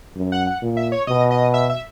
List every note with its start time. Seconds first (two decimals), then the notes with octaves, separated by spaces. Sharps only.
0.16 F#2
0.32 F#5
0.47 F#5
0.62 A#2
0.77 E5
0.92 C#5
1.07 B2 D#5
1.31 D#5
1.54 E5
1.70 E5